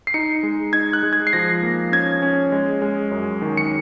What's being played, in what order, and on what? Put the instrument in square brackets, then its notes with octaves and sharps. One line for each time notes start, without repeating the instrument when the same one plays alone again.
[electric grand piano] C7
D#4 C#7
G#3
D#4 G#6
F#6
G#3
G#6
C7
F3 A#6
A#3
C#4 G#6
C#4
G#3
G#3
F#2
D#3
C#7